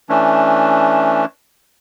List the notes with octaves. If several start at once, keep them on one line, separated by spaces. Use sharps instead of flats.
E3 A3 C#4 D4